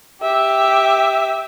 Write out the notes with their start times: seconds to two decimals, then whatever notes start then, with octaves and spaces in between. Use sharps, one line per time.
0.22 G4 E5